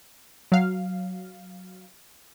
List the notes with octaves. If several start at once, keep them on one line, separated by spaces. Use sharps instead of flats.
F#3 F5